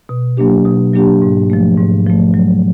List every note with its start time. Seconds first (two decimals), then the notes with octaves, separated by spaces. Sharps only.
0.09 B2
0.37 F#3 A#3 D4 G4
0.65 B2
0.93 F#3 A#3 D4 G4
1.22 G#2
1.50 F3 A3
1.77 G#2
2.06 F3 A3
2.34 F#3